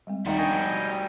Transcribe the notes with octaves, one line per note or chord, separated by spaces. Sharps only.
G3 G#3 C4
D#2 D#3 G3 D#4 F#4 E5 A#5
D4 A#4 D#5 G5 G#5